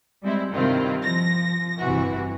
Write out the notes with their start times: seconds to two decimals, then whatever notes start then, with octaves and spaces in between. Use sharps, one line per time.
0.22 G3 G#3 C4 E4
0.53 G2 C3 D#3 C4 E4 F4
1.02 F3 A#6
1.79 G1 C3 E3 F#4